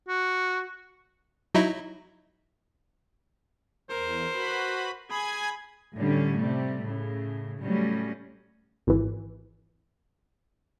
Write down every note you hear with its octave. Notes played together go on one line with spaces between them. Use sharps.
F#4
F#3 D#4 E4
E2 A#4 C5
F#4 B4 B5
G#4 G#5 B5 G#6
A2 D3 G3 C#4
C3 G3 A3
A2 C#3
A2 F#3 G3 C#4
G#1 E3